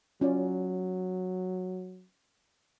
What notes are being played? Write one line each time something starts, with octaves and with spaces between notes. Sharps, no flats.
F#3 C#4 F4 D5